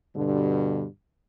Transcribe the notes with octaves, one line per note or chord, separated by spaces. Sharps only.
G2 B2 D3